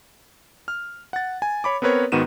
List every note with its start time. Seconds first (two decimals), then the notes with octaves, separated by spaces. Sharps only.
0.68 F6
1.13 F#5 A6
1.42 G#5
1.64 C#5 B5 D6
1.82 B3 C4 A#4 B4 C#5
2.12 G#2 D#3 B3 F#4 D#7 E7